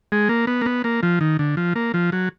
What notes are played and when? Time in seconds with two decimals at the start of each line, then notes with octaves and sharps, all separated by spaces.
0.12 G#3
0.29 A#3
0.47 B3
0.61 A#3
0.66 B3
0.84 A#3
1.03 F3
1.21 D#3
1.39 D3
1.57 F3
1.76 A#3
1.94 F3
2.12 F#3